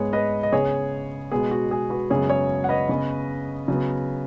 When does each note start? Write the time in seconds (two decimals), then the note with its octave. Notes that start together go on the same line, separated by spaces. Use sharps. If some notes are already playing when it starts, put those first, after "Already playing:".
Already playing: G#2 G#3 B3 G#4 C#5
0.13 B4 D#5
0.43 D#5
0.52 C#3 B3 G#4 C#5
1.32 B2 G#3 B3 G#4
1.51 F#4
1.71 G#4
1.90 F#4 B4
2.10 F#2 C#3 G#3 B3 G#4 C#5
2.29 G#4 C#5
2.64 F#5
2.69 B4 D#5
2.89 C#3 B3
3.68 C#3 F#3 B3